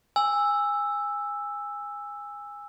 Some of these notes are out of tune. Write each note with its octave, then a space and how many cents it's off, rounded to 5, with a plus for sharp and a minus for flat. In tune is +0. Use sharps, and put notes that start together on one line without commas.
G#5 -20 E6 +0